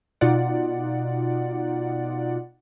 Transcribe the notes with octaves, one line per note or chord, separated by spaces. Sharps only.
B2 D#4 F4 D5 F#5